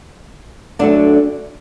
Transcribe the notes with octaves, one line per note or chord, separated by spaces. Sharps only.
D2 D3 F#3 A3 D4